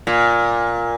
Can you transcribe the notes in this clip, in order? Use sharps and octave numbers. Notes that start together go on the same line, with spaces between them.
A#2